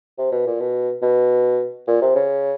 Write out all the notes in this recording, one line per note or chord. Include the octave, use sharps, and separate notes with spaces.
C3
B2
A#2
B2
B2
A#2
C3
C#3